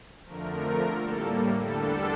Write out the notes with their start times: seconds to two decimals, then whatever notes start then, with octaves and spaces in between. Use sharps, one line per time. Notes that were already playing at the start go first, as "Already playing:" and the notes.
0.24 F2 D3 F3 A3 A#4
0.94 A2 G3 A#3 A4
1.63 E2 D3 G3 D4 A4